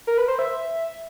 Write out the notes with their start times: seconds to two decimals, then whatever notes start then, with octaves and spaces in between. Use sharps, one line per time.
0.07 A#4
0.18 B4
0.28 C5
0.39 E5